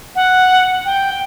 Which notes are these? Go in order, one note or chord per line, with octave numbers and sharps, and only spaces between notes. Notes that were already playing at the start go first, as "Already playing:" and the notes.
F#5
G5